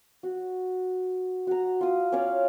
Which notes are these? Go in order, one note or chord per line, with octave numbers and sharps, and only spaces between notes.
F#4
F#4 A#5
F4 D#6
C#4 C#5 D5 F5